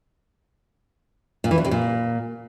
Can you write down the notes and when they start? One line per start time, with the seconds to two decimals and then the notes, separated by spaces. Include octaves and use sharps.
1.44 A#2
1.51 E3
1.58 E2
1.65 C3
1.71 A#2